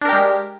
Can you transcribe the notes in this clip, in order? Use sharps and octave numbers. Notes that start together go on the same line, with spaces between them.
G#3 D4 G4 A#4